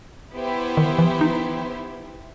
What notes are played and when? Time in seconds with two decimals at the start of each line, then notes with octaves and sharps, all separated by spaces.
0.33 B3 E4 G4 C5 E5
0.77 D#3
0.99 E3
1.21 D#4